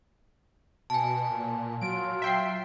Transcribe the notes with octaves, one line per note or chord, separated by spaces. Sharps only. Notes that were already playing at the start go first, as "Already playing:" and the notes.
B2 G#5 A5
A#2
F#3 F4 D7
E5 G5 C7